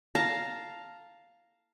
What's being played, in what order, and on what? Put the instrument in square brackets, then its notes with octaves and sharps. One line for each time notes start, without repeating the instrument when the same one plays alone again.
[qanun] F5 A5 A#5